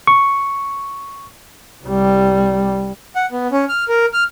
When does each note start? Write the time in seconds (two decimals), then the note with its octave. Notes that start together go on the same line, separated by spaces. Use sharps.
0.07 C#6
1.85 C2 G3
3.16 F#5
3.32 B3
3.52 C#4
3.69 F6
3.88 A#4
4.13 F6